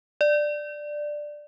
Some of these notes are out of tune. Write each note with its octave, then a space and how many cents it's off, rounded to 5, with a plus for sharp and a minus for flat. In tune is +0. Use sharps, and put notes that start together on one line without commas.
D5 +10